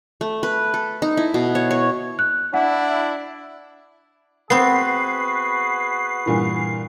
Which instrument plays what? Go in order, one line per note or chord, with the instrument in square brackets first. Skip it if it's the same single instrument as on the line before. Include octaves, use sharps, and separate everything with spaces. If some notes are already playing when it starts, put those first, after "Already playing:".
[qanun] A3
B4
A4
D#4
E4
B2
C#5
C#5
[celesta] F#6
[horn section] D4 E4 [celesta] F#5
[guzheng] B3 C4 [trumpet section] F#4 G#4 B4 [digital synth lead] C7
[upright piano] G2 A#2 E3